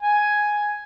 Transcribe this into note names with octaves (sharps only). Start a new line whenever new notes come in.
G#5